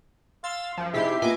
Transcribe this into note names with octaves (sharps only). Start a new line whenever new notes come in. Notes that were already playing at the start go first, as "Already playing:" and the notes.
F5 C6 E6 F6 A6
F#2 F3
C3 D#4 E4 G4 G#4 E5 C7
A#3 B3 F4 D#5 G#5 D6